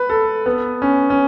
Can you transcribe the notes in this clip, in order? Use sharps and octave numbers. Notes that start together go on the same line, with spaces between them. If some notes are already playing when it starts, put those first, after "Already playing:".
Already playing: B4
A4
B3
C#4
C#4